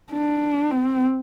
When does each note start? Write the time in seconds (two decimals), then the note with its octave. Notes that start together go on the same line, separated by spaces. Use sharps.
0.12 D4
0.71 C4